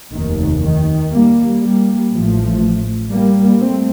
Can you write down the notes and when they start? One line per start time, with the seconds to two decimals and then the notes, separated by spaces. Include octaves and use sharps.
0.12 F1 D#2 D#3
0.62 D#3
1.12 G3 A#3
1.62 G3 A#3
2.12 A1 A2 F3 A3
3.11 G3 A#3
3.61 A3 C4